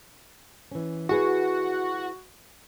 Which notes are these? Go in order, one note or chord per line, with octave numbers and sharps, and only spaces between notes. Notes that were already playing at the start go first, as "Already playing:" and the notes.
E3 C#4
E4 F#4 G#4 B4